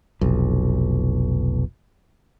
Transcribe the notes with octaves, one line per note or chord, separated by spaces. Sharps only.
F1 B1